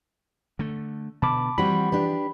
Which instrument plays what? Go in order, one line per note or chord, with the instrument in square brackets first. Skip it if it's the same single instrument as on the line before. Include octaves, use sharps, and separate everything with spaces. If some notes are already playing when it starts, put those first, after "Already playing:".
[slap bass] D3 A3
[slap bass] B2 D3 [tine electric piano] A5 B5 D6
[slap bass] E3 F3 [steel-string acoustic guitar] G3 C4 F#4 [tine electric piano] B5
[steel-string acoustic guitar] D4 G4 B4